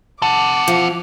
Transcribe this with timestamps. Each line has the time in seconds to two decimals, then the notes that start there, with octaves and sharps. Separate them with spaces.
0.22 C4 F#5 A5 D6
0.68 F3